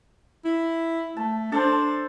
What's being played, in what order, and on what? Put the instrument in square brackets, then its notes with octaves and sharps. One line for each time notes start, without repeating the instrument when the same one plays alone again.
[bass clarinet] E4
[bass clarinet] A3 [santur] A5
[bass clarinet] D4 [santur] A4 C5